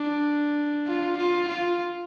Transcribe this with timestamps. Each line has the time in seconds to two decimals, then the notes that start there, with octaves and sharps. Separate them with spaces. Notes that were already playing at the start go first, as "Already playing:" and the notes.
Already playing: D4
0.87 F4
1.17 F4
1.49 F4